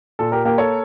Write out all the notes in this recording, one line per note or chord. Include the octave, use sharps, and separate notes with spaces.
A#2 A4
G4 A#4
A#3 G4 A#4
A4 C#5